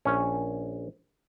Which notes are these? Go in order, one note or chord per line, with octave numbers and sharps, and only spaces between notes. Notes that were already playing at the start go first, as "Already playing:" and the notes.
A#1 C#4